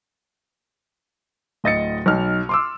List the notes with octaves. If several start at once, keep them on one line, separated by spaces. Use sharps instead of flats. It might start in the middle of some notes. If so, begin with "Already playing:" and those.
D1 D#5 A6 C#7
B1 D#4 F6
C6 D6 E6